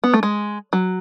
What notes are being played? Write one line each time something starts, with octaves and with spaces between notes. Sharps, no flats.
B3
A3
G#3
F#3